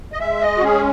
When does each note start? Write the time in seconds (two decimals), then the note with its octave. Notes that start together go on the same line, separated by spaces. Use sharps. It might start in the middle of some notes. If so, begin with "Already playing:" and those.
0.13 D#5
0.19 G#3 E5
0.41 D#5
0.58 F#4
0.63 C#4 G#4